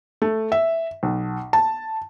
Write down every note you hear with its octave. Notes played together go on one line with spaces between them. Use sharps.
A3
E5
B1
A5